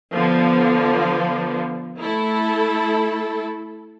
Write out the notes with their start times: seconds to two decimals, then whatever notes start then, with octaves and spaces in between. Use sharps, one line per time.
0.15 D3 F3 B3
1.98 A3 E4 A4